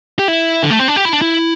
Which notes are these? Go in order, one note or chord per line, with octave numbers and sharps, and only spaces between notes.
G4
E4
D3
A3
C4
D4
G4
E4
D4
E4